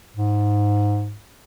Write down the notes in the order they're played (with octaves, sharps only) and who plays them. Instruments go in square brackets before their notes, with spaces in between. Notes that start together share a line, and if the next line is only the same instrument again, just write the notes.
[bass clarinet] G#2